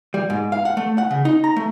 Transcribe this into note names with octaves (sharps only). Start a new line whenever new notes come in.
G3
G#2
F5
F#5
A3
F#5
C#3
D#4
A#5
A3